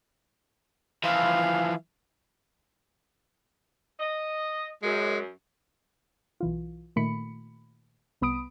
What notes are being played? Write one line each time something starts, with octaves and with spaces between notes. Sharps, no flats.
E3 F3 F5
D#5
F#2 G#3
B1 E3 F4
A#2 D#3 A3 B5 C#7
C2 B3 B5 D#6 D7